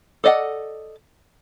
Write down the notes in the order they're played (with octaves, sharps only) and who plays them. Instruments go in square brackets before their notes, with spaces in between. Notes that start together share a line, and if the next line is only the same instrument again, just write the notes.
[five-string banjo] A4 D5 D#5 F5 F#5